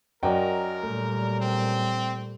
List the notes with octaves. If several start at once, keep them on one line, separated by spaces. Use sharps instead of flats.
F#2 F#4 A#4 D5 D#5 G5
A#2 G3 A3
C4